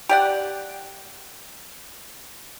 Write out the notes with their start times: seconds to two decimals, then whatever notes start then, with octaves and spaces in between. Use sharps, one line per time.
0.09 G4 D5 F#5